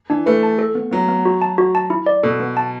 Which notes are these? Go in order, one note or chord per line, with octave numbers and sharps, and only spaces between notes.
E3 D4
A3 B4
A5
A4
B3
F#3 B3
B3
F#4
A5
F#4
A5
E4
D5
B2 A4
B3
A5